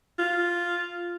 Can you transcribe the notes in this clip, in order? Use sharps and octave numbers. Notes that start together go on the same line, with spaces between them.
F4